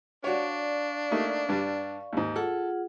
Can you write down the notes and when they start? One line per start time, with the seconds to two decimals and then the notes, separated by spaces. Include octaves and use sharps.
0.24 D4 F#4 C#5 D5 F5 C#6
1.11 A3 A#3 D#4
1.49 G2 G3 G4
2.13 D#2 G#2
2.36 F4 G#4 A4 F#5